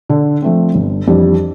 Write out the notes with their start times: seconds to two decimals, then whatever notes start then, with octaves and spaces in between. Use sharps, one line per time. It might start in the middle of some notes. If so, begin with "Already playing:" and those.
0.09 D3
0.42 F3 A3 C4
0.75 G1
1.07 F2 E3 G3 D4